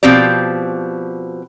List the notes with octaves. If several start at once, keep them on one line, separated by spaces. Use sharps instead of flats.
B2 F3 C4 G4 D5